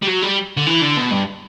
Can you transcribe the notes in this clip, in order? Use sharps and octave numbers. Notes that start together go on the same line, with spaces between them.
G3
F#3
G3
D3
E3
D3
B2
G2